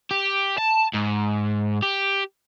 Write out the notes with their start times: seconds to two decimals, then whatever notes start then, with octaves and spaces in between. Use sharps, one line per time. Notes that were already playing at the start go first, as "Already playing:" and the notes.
0.11 G4
0.58 A5
0.93 G#2
1.83 G4